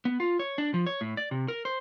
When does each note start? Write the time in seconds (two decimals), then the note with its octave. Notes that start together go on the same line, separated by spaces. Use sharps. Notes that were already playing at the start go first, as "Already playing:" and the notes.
0.05 B3
0.20 F4
0.39 C#5
0.58 D4
0.74 F3
0.86 C#5
1.01 A2
1.17 D5
1.31 C3
1.48 A#4
1.65 C5